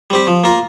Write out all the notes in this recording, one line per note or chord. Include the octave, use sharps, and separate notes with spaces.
G3 C4 G4
F3
A#3 F4 A#4